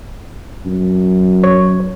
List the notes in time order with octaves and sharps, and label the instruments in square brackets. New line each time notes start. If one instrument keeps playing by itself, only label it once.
[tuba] F#2
[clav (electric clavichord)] C#5